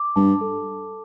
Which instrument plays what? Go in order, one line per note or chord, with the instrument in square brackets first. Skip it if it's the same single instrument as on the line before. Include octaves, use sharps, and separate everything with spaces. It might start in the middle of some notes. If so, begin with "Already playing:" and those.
Already playing: [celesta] D6
[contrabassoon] G2 [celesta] A5
[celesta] A4